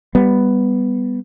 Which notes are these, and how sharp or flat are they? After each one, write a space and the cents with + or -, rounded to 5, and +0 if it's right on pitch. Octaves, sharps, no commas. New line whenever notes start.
G3 +10 B3 +0